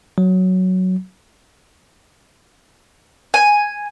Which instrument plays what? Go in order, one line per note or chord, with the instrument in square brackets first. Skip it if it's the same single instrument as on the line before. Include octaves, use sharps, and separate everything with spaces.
[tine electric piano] F#3
[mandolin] G#5